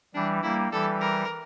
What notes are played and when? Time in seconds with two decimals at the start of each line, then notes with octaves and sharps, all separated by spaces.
0.15 E3 G3 D4
0.43 G3 A#3 E4
0.72 E3 G3 A4
1.01 A#4